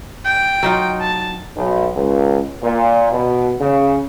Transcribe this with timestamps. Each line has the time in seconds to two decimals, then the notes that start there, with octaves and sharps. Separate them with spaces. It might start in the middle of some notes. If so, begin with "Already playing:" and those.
0.25 G5
0.63 F#3 D#4 F4
1.01 A5
1.56 B1
1.94 C#2
2.62 A#2
3.12 B2
3.60 C#3